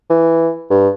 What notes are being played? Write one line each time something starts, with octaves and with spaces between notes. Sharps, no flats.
E3
G2